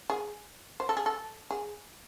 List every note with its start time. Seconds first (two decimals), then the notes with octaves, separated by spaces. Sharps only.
0.10 G#4
0.80 C5
0.89 A4
0.97 G#4
1.06 A4
1.51 G#4